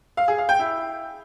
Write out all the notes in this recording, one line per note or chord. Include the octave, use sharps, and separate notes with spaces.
F5
G#4
F5
G5
E4